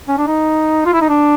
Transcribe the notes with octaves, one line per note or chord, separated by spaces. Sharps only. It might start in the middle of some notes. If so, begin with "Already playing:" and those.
C#4
D4
D#4
F4
E4
D#4
D4